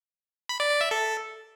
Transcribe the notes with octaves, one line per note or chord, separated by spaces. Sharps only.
B5
D5
D5
E5
A4